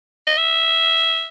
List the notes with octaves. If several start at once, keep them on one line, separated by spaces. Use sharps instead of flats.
D#5
E5